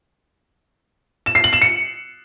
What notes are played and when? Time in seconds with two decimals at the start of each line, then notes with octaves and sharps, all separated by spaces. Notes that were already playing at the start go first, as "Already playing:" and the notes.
1.26 E7
1.35 C7
1.44 F#7
1.53 E7
1.62 C#7